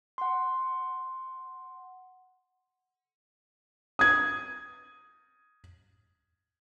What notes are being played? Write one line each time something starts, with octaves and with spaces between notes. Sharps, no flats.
F#5 C6
D#6 G#6